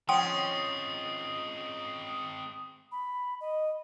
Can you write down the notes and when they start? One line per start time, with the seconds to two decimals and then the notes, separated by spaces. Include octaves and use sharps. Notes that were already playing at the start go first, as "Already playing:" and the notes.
0.09 F3 G#3 C4 C#4 F#5 G5 C6 D#6
2.92 B5
3.41 D#5